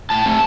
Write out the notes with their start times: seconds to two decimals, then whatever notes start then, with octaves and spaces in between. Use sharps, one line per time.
0.10 A2 A5
0.26 A3 C4